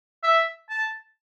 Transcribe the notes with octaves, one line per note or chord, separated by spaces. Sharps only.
E5
A5